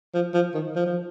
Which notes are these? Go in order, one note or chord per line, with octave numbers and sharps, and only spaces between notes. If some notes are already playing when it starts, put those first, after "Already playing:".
F3
F3
D#3
F3
F3